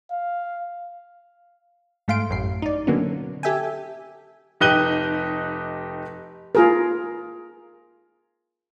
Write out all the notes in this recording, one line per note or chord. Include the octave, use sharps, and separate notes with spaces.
F5
G#2 A3 F5 C6 D7
A1 F#2 A2 C7
D#4 D5
B2 D3 F#3 A#3 B3 C#4
G4 A4 E5 G5 G#5
F1 D#4 G4 F#6 D#7 G7
F4 G#4 A#4